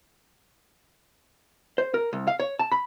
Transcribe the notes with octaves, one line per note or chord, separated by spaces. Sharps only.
C5
A#4
C2
F5
C#5
A5
B5